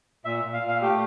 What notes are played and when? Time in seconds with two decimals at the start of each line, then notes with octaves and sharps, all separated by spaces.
0.25 A#2 E5
0.44 A#2
0.53 F5
0.62 A#2
0.68 F5
0.82 A3 G4